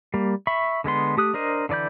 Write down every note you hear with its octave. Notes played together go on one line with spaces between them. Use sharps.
G3 A#3
E5 B5 C#6
D3 G#3 B3 C6
A3 G4 D#6 F#6
D4 A#4 C5 D#5
D3 E3 D5 B5 G6